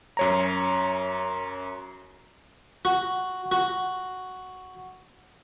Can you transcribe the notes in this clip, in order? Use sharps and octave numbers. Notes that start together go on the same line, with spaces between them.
F#2 C#5 A#5
F#4
F#4